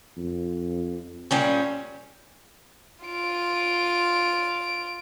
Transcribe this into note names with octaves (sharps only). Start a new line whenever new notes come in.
F2
A#2 G3 C#4
F4 D7